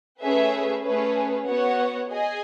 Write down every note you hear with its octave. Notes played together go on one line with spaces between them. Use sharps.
A3 C#4 G#4 B4 E5
A3 C#4 G#4 B4
B3 F#4 C#5 F#5
G#4 D#5 G#5